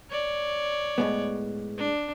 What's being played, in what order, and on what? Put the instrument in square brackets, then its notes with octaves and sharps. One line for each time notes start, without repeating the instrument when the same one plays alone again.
[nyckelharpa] C#5 D5
[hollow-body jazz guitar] A2 G#3 B3
[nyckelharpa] D4